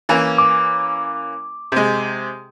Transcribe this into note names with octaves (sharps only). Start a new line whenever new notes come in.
E3 A#3 C#4
D6
C3 G#3